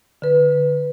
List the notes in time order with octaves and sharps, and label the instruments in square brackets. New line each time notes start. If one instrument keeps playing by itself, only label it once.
[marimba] D3 B4